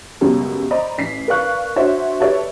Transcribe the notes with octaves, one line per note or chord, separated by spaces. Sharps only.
C#2 F#2 B2 G3
C5 D5 D#5 A#5 B5
A1 B6 C7
A#4 B4 D5 F5 C#6 F#6
D4 F#4 C5 C#5 E5
G4 A4 B4 C#5 D5 E5